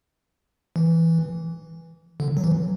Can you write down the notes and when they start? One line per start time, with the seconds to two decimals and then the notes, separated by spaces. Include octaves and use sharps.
0.76 E3
2.20 D3
2.37 F#3
2.44 E3